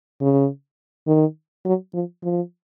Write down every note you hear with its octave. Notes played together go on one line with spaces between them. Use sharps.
C#3
D#3
F#3
F3
F3